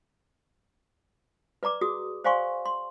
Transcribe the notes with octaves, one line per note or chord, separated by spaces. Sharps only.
B4 D5 A#5 D6
F#4 G#4 D#6
C5 D5 F5 G#5 C6 C#6
C6